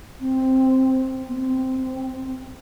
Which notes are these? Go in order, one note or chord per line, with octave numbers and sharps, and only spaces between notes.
C4
B3
C4